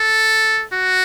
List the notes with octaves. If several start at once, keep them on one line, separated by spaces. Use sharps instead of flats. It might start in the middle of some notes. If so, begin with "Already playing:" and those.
Already playing: A4
F#4